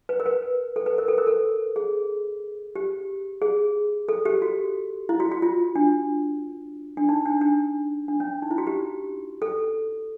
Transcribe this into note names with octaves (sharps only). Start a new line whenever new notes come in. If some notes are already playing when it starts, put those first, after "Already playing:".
B4
A#4
B4
A4
B4
A#4
A4
A#4
A4
G#4
G4
G#4
A4
G4
F#4
E4
F#4
F#4
F4
D4
D4
D#4
D4
D4
D4
C#4
D#4
E4
F#4
G4
A4